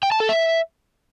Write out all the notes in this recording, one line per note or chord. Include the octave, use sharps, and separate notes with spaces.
G5
A5
A4
E5